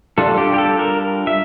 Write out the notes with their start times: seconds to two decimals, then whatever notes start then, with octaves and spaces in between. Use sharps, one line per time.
0.18 G3 D4 F4 A4
0.38 G4
0.54 G4
0.58 A4
0.79 A#4
1.27 E5